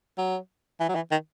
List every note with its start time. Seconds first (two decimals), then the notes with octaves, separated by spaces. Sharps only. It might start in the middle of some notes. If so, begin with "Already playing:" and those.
0.18 F#3
0.80 E3
0.88 F#3
0.95 E3
1.11 D#3